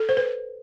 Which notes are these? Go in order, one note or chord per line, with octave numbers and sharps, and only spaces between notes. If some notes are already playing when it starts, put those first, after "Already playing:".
Already playing: A4
C5
B4